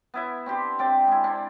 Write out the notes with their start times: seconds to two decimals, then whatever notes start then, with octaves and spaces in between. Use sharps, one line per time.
0.14 B3 E4 E5
0.46 C4 D4 G4 C6
0.79 C3 C4 D5 G5
1.07 G#3 E4
1.24 C4 D4